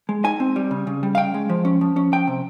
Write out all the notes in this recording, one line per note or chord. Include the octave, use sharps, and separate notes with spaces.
G#3
D#4 G#5
C4
G3
C#3
C#3
G3
F5
C#4 G5
G#3
F3
C#4
F3
C#4
F3 G5
C3